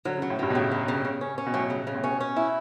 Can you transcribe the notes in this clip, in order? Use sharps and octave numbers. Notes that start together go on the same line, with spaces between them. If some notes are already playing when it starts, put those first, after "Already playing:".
D3 F#3
C#3
F#3
A2
G2 F#3
B2
A2 C#3
F#3
C#3
C#3
C#4
C#4
B2
A2 F#3
C#3
C#3
A2
B2 C#4
C#4
E4